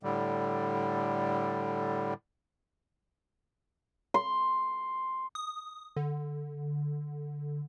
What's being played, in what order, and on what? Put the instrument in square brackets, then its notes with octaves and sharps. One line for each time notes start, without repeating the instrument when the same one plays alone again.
[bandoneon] A2 D3 G3
[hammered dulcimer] C6
[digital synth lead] D#6
D3